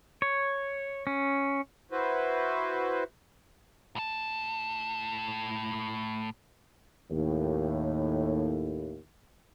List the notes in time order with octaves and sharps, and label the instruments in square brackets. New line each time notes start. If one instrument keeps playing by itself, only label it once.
[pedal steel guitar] C#5
C#4
[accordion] E4 F#4 B4 C5
[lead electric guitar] A2 A5
[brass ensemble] D#2 A2